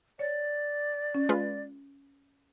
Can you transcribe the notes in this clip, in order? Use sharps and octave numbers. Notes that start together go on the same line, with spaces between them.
C#5 D5
C#4
G#3 F4 B4